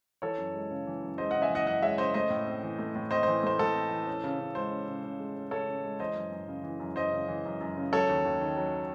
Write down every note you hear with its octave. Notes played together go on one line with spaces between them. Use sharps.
E3 A4 C#5
F#2
G#3
C#3
E3
F#2
G#3 C5 D#5
C#3 D#5 F#5
E5 G#5
E3 D#5 F#5
F#2 D#5 F#5
G#3 C#5 E5
C#3 C5 D#5
A3 C5 D#5
A2
C4
E3
A3
A2
C4 C5 D#5
E3 C5
A3 C5
A2 A4
C4
E3
C#4
C#3
C#3
G#3 C5
C#4
C#3
C#3
G#3
C#4
C#3 A4 C#5
C#3
G#3
E3 C5 D#5
F#2
F#2
C#3
E3
F#2
F#2 C5 D#5
C#3
E3
F#2
F#2
C#3
F#3 A4 C#5
D#2
D#2
D#3
F#3